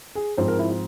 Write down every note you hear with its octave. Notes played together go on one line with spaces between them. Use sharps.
G#4
G#2 F3 C4 C5
A#4
E4
F4